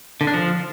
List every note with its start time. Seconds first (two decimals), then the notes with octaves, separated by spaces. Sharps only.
0.21 D3
0.27 D4
0.34 F3